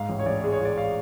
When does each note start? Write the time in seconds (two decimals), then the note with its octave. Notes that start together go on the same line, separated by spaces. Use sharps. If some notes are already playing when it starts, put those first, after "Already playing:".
Already playing: G#2 F5
0.09 A1
0.19 C#5
0.26 A1 D5
0.44 G#3
0.53 C#5
0.61 A1 D5
0.78 F5